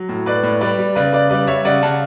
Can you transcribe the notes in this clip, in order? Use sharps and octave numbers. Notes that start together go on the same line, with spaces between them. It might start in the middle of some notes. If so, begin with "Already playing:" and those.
Already playing: F#3
A2
A2 B4 D5
A2
G3 B4 D5
G3
C#3 B4 D5
C#3 B4 D5
G3 B4 D5
G3 C#5 E5
C#3 D5 F#5
C#3 F#5 A5